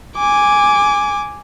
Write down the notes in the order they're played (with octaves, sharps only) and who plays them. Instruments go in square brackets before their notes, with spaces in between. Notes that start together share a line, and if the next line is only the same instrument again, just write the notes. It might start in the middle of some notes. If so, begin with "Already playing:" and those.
[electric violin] G#5 D6